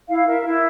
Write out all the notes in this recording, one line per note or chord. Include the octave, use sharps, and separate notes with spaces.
E4 F5
A#4 E5
E4